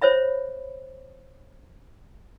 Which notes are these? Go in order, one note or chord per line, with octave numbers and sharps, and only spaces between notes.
C5 C#5 E5 B5